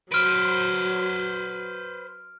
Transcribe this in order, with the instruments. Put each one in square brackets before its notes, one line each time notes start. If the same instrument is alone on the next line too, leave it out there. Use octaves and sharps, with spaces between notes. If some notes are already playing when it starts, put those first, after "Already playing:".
[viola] F#3 [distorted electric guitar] B4 C5 [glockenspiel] F6 D7